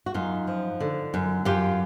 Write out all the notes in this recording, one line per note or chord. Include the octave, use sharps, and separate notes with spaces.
F#4
F#2 D#4 F4
F3
D3
F#2
F#2 F4 G4